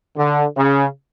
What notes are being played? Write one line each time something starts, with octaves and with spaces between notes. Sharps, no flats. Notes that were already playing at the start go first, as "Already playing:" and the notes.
D3
C#3